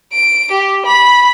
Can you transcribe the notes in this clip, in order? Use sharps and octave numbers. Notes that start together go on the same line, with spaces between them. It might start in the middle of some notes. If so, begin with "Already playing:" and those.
D7
G4
B5